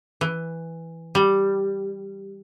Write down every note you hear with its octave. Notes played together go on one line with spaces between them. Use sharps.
E3
G3